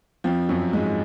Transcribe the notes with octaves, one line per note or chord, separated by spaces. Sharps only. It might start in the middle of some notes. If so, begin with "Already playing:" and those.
F2 F3
F#2 F#3
G#2 G#3